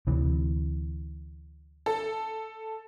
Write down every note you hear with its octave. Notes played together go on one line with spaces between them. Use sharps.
D2 C3 E3
A4